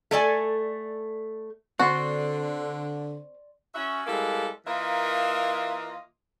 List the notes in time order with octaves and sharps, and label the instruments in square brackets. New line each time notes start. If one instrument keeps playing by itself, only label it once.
[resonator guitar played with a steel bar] A3 A4 D5 G#5
[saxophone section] D3 [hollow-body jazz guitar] C4 [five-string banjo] F#4 [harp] D5 C6 C#6
[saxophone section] C#4 F#4 E5
G3 G#3 A#3 C4 E4 A4
E3 A#3 F4 A#4 D#5 E5